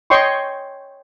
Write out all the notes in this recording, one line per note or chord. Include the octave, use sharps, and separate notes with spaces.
C#5 D#5 G5 C6 C#6